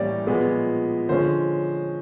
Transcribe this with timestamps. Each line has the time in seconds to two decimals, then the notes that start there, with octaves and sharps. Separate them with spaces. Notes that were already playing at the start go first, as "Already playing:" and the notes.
Already playing: A2 E3 G3 A#3 C#4 D5
0.27 A#2 F3 G#3 B3
1.09 D3 F3 G#3 C#4 C5